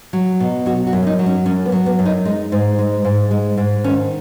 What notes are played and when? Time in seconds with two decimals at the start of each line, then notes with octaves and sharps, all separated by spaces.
0.13 F#3
0.40 B2
0.66 F#3 F#4
0.87 F#4
0.93 F#2
1.03 C#4
1.07 D#4
1.19 F#3
1.26 C#4
1.46 F#2 C#4
1.66 B3
1.72 F#3
1.86 B3
1.99 F#2
2.05 D#4
2.25 G#3 D#4
2.52 G#2
2.78 G#3
3.05 G#2
3.31 G#3
3.58 G#2
3.84 D#3 C#4